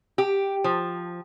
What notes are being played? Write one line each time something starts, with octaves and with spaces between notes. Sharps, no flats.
G4
F3